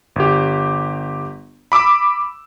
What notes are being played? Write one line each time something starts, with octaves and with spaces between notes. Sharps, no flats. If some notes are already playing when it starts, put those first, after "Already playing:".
G1 G4
B5 D6 E6